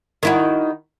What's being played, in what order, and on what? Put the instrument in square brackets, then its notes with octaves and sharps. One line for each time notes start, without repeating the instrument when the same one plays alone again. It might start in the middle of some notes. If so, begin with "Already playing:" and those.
[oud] D#3 E4 F#4